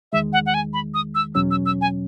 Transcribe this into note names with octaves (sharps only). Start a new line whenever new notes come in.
E2 D#3 G#3 E5
F#5
F#5
G#5
B5
D#6
E6
E2 B2 F#3 C#4 E6
E6
E6
G#5